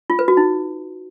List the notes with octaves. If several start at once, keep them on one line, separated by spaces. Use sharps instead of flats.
F4
B4
F#4
D#4